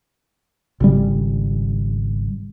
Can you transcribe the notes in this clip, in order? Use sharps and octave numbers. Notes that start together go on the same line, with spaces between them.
G#1 C#3 G3